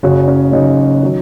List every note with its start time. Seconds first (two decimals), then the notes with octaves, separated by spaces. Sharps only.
0.03 F#1 F#2 C#3 F#4
0.28 C#4
0.52 F#1 F#2 C#3 D#4
1.03 D#3 F#3